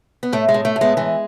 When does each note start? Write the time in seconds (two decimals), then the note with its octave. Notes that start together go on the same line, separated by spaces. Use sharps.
0.23 B3
0.33 A2 A3
0.49 G#3
0.54 A2
0.65 A3
0.76 A2
0.81 G#3 B3
0.97 E3 G#3